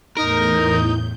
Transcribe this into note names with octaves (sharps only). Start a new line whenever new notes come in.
E2 A2 D#4 A#4 G6